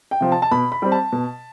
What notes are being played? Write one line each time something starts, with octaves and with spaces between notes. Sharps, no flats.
G5
C3 F3
A5
A5
B2 B5
B5
G3 C4
A5
B2